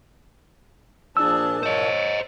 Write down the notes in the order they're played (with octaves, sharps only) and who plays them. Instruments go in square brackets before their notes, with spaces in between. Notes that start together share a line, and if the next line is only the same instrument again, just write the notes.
[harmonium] A#2 F3 A5 [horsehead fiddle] D4 G#4 [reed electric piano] E6
[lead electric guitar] C5 D#5 [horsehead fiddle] C#5